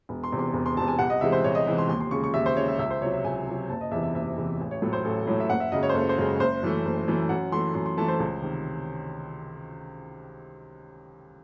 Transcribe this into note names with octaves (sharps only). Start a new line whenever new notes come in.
E1
C6
E2 C3
C6
E1
C6
E2 C3 A5
G#5
C2 F#5
D#5
C3 E3 G#3 E5
C5
C2 C#5
D#5
C3 E3 G#3
C6
D#2 C6
C6
C#3 G#3 C#6
C#6
D#2 E5
C5
C#3 G#3 C#5
E5
C#2 E5
C5
C3 F#3 C#5
E5
C#2 G#5
C3 F#3
F#1 A5
D#5
E2 C3 E3 E5
E5
F#1 E5
E2 C3 E3
A1
C#5
A2 F#3 A3 A4
C5
A1 A4
A2 F#3 A3
E5
F#1 F#5
E5
F#2 C#3 G#3 D#5
C#5
C5
F#1 A4
C5
F#2 C#3 G#3
F#1 C5
F#2 E3 A3
F#1
F#2 E3 A3
F#2 F#5
E3 A3 C6
F#2 C6
C6
E3 A3 A5
C5
C#2
C3 D#3